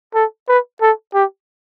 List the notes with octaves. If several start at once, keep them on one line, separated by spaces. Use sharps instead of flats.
A4
B4
A4
G4